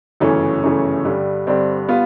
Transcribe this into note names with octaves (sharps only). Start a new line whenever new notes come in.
G1 F#2 C#3 E3 A3 C#4
G1 F#2 C#3 E3 A3
G2 D3 G3
G2 D3 G3 C4
G3 B3 F4